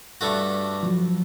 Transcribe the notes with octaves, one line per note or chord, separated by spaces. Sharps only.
G2 A3 F#4
F3 F#3